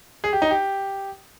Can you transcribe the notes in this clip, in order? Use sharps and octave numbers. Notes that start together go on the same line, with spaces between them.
G#4
G4
D#4
G4